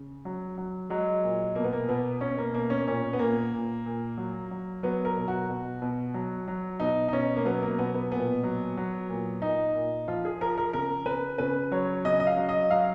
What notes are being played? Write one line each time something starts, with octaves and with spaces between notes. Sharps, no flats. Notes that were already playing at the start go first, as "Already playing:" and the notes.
Already playing: C#3
F#3
F#3
F#3 G#3
A#2
B2 A#3
B3
A#3
B2 B3
B2 C#4
A#3
B2 A#3
C#4
A#2 C#4
B3
A#2 A#3
A#2
A#2
F#3
F#3
F#3 B3
A#4
B2
F#4
B2
B2
F#3
F#3
B2 D#4
D#4
B2 C#4
A#3
F#3 B3
A#3
B2 B3
B3
A#2 B3
F#3
F#3
A#2
A#2 D#4
A#2
F3 F4
G#4
F3 A#4
A#4
C#3 A#4
C#3 B4
C#3 B4
F#3 C#5
C#3 D#5
D#5
F5
F#3
D#5
F#3 F5